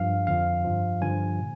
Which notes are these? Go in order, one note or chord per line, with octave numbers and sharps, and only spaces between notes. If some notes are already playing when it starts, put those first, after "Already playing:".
Already playing: G2 F3 F5
F2 D3 F3 F5
G2 F3
G2 D3 F3 G#5
A#2